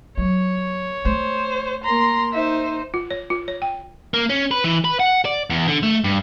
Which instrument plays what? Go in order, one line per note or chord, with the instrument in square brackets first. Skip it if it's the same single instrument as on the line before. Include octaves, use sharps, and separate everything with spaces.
[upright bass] F#3 [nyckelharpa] C#5
[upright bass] A3 [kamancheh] C5
[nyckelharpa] A#3 A#5 [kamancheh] C6
[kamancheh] D#4 C5 [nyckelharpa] E5
[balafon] F4
C#5
F4
C#5
G5
[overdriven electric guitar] A#3
C#4
B4
E3
B4
F#5
D5
E2
D3
A3
G2